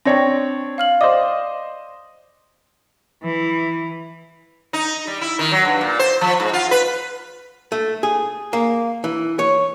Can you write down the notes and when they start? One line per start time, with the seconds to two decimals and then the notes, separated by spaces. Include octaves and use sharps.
0.05 C4 D4 C#5 G5 A#6
0.78 F5 F6 F#7
1.01 C5 D5 D#5 D6 D#6
3.24 E3
4.73 D#4
5.07 G3
5.21 E4
5.39 D#3
5.51 F#3
5.65 G2
5.81 A#2
5.99 C5
6.21 F3
6.40 G#2
6.53 F4
6.71 B4
7.72 A3
8.03 G#4
8.53 A#3
9.04 E3
9.39 C#5